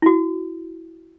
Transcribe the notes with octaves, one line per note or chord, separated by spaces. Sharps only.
E4 F#4